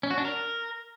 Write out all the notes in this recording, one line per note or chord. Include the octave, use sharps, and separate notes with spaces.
C#4
F#4
D4
A#4